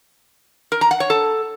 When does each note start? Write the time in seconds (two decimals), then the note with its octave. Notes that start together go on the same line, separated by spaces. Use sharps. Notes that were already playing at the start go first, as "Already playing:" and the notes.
0.72 A#4
0.81 A#5
0.91 F#5
1.00 C#5
1.10 A4